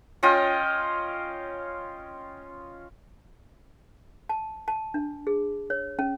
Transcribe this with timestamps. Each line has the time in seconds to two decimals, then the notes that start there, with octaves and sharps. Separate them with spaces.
0.23 C#4 F4 D#5 G5
4.29 A5
4.68 A5
4.94 D4
5.27 G#4
5.70 C#5
5.99 C#4